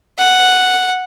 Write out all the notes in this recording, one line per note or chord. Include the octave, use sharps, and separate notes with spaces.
F#5